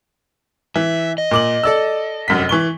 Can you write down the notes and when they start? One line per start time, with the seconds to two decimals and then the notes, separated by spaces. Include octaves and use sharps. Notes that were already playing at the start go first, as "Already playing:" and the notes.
0.76 E3 E5
1.18 D#5
1.31 A#2 D6 F#7
1.63 A4 D5 E6
2.28 F1 F#2 B6
2.49 E3 C#6 G7